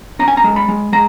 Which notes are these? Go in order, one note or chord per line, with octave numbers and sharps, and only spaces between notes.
C#4 A#5
G#5
A#5
G#3
B5
G#3
G#3 A#5